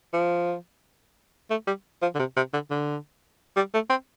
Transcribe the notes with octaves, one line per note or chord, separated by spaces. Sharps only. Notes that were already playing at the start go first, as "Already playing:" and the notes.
F3
A3
G3
F3
D3
C3
C3
D3
D3
G3
A3
C4